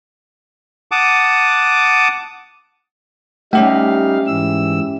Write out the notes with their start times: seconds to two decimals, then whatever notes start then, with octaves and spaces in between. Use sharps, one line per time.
0.92 F#5 A5 D6 D#6
3.53 G3 A3 C#4 D#4 G4 E5 F5
4.27 G#2 E3 E6